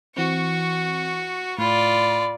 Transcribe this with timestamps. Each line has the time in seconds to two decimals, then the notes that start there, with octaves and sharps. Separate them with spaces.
0.17 E3 C4 F#4 C#6
1.58 A2 F4 D5 B5